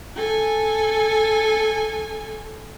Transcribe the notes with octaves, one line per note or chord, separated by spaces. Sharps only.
A4 G#5